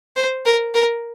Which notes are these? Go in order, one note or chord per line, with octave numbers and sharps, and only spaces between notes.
C5
A#4
A#4